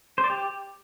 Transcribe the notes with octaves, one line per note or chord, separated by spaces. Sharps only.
C5
D5
G4